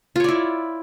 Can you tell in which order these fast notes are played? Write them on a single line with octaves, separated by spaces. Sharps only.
F4 C#5 D5 E4